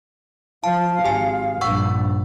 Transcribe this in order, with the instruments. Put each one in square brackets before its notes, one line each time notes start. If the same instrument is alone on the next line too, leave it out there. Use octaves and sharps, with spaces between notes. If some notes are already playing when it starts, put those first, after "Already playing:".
[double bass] F3 [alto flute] F5 [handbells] A5
[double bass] G#1 [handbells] G4 G#5
[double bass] A#1 G2 [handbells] F#5 C#6 E6